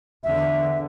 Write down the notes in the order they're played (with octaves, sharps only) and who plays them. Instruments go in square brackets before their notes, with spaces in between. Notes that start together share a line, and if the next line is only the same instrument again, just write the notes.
[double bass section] E2 D3 [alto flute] E5